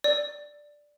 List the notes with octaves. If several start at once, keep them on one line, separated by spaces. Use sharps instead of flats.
D5